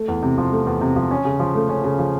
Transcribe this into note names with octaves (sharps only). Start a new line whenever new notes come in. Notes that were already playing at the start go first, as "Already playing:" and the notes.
Already playing: A3
E2
C3
F3
A3
E2
C3
F3
C#4
C#3
F3
A3
C#4
C#3
F3